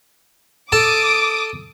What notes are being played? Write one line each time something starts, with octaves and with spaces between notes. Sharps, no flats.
A4 A5 D6 D#6 D7